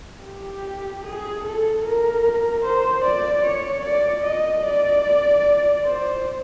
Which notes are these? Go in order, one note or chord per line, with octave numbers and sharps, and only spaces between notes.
G4
G#4
A4
A#4
C5
D5
C#5
D5
D#5
D5
C5